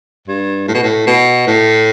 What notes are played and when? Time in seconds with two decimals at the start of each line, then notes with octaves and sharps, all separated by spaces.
0.28 G2
0.68 A2
0.75 B2
0.83 A2
1.07 B2
1.47 A2